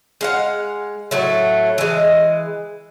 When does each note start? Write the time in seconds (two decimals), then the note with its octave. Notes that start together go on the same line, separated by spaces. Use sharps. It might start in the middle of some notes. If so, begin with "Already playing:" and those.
0.21 G#3 F5 F#5
1.11 A2 F#3 A3
1.78 E3 G#3